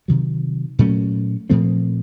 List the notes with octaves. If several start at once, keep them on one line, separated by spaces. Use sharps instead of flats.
C3 D#3 F#3
A#2 F#3 A3 C#4
A#2 F3 A3 C4